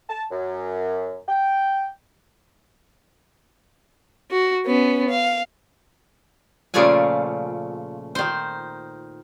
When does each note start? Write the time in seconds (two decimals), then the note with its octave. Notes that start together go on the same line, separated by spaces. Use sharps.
0.09 A5
0.31 F#2
1.28 G5
4.31 F#4
4.65 B3 C#4
5.09 F5
6.74 A#2 C#3 F3 A3 G#4 G#5
8.15 D#3 C5